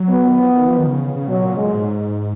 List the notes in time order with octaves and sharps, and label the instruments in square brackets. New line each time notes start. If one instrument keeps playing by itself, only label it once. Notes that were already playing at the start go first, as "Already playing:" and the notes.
Already playing: [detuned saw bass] F#3
[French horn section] B3
[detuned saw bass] D#3
F3
D#3
F3
D#3
C#3
C#3
[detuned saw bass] B2 [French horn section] F#3
[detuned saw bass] A#2
[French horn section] G#3
[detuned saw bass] A#2
G#2